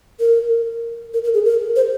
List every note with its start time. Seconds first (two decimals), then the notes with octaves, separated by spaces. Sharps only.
0.20 A#4
1.14 A#4
1.24 A#4
1.34 G#4
1.45 A#4
1.76 C5